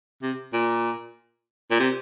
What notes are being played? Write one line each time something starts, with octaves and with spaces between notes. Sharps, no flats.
C3
A#2
A#2
C3